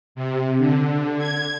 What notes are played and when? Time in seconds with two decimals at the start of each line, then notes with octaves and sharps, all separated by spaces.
0.15 C3
0.58 D3
1.18 G#6